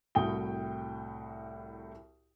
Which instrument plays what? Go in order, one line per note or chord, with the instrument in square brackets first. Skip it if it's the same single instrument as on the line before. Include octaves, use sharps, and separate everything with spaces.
[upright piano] C2 A2 F#4 G5 D#6 G7